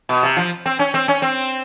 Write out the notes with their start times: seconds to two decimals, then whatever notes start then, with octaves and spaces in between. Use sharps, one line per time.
0.09 B2
0.23 C3
0.37 F3
0.66 C4
0.79 C#4
0.94 C4
1.08 C#4
1.22 C4